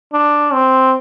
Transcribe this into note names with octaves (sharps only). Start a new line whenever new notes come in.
D4
C4